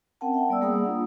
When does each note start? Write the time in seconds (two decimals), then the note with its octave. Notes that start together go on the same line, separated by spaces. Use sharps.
0.21 C4 C#4 A#4 F#5 G5 A5
0.34 E5 G5
0.49 G3 B3 D5 E6
0.61 G3 A#3 G#4 F#5 B5 D#6
0.85 D4 F4